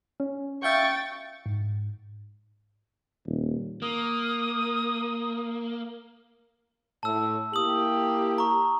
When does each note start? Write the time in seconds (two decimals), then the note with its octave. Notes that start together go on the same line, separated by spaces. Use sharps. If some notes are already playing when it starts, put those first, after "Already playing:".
0.20 C#4
0.63 E5 F5 G5 C#6 G6 A6
1.46 G#2
3.26 D#1
3.82 A#3 D#6
7.03 A2 A5 E6
7.53 A#3 E4 G4 D#6 F#7
8.38 A#5 C#6